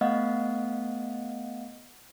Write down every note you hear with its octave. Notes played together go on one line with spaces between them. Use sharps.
A3 B3 D#5 F5 F#5